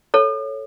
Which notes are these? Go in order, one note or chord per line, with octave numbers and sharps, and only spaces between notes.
A4 C#5